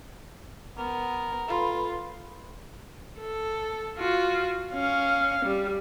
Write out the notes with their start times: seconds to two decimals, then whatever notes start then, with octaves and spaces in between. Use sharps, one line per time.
0.77 B3 A#4
1.49 F4 A4 B4 B5
3.19 A4
3.98 F4 F#4
4.73 C#4 F5
5.45 G3